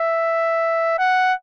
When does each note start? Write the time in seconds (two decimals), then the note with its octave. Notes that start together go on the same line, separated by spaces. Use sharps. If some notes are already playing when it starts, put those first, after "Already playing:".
Already playing: E5
0.99 F#5